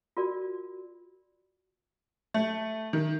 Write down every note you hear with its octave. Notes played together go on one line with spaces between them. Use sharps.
F4 F#4 A#4 D5
A3
D#3